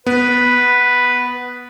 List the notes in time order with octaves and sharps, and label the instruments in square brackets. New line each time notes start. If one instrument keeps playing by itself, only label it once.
[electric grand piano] B3 [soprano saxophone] B4